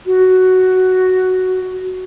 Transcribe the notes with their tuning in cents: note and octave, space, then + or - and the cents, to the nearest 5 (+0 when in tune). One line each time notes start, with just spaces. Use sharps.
F#4 +5